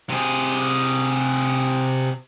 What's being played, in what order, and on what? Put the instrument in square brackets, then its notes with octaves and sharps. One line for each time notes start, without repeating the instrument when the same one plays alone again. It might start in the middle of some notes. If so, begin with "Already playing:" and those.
[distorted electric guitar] C3 G#4